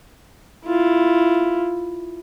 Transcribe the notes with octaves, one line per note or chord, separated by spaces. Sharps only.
E4 F4